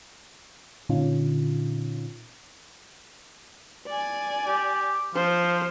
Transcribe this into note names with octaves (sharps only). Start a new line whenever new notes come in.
A#2 D3 C#4 D#4 F4
D5 G#5
G4
F3 C5